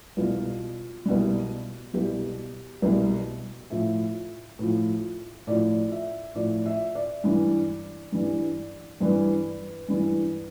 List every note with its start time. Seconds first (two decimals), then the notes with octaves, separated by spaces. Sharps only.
0.17 C2 B2 G3 F4
1.06 C2 B2 G3
1.94 C2 B2 G3 G4
2.82 C2 B2 G3
3.70 A2 F3 E5
4.59 A2 F3
5.47 A2 F3 D5
5.92 E5
6.35 A2 F3 D5
6.66 E5
6.95 D5
7.24 G2 E3 G3
8.12 G2 E3 G3
9.00 G2 E3 G3 B4
9.88 G2 E3 G3